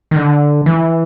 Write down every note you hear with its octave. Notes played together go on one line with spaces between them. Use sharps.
D#3
D3
E3